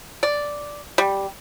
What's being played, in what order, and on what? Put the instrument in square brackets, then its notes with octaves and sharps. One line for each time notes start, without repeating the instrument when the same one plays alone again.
[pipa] D5
G3